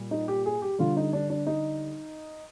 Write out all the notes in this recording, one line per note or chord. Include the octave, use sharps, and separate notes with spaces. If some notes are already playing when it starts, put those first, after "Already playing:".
Already playing: A#2 G3
D#4
G4
G#4
G4
D3 G3 F4
D#4
D4
D4
D#4